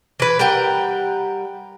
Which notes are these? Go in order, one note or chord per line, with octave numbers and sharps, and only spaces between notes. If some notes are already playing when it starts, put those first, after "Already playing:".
E3 B4
G3 A#4 F#5 G5